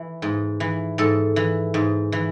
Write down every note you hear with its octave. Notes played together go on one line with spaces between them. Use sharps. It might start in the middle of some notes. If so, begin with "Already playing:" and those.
Already playing: E3
G#2
E3
G#2 A4
E3
G#2
E3